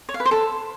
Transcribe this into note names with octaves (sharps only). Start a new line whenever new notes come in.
C#5
F5
B4
C5
A4